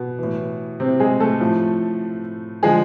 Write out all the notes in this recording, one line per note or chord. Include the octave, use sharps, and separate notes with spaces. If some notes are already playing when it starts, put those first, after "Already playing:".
Already playing: B2 B3
A2 E3
C3 C4
G#3 G#4
A3 A4
A2 F3
D3 F3 G#3 G#4